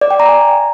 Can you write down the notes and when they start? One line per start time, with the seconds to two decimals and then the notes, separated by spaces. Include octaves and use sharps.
0.01 D5
0.11 G5
0.20 A#5
0.29 G#5